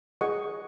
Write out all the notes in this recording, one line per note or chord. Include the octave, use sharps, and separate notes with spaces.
G#4 D#5 F#5 C#6